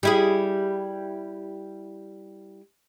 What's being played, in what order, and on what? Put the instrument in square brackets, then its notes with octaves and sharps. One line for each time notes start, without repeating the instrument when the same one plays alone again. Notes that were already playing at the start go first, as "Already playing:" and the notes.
[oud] G3 E4 G#4